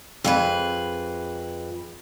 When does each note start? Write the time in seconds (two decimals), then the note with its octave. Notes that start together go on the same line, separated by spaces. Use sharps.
0.24 F2 G#4 B4